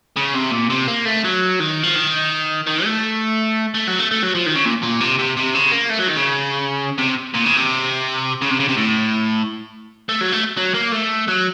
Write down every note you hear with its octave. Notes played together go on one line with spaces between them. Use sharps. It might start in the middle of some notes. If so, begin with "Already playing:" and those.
C#3
C3
A#2
C3
A#3
A3
F#3
D#3
F3
D#3
D#3
A3
A3
F#3
A3
A3
F#3
F3
D#3
C#3
A#2
A#2
C3
C3
C3
C#3
A#3
A3
F#3
D#3
C#3
C3
A#2
C#3
C3
C#3
C3
C#3
C3
A2
A3
F#3
A3
F#3
A#3
A3
F#3